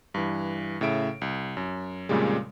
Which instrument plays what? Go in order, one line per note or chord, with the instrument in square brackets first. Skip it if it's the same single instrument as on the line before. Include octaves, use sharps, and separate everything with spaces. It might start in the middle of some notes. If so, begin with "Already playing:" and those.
[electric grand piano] G2 E3
A2 C#3 E5 D7
C2
F#2
F2 A#2 C#3 G3 G#3